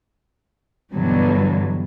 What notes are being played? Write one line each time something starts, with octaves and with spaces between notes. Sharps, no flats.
G2 B2 D3 E3 F#3 G3